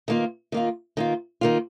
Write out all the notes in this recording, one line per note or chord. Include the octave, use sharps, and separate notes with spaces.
D#3 A#3 F4
D#3 A#3 F4
D#3 A#3 F4
D#3 A#3 F4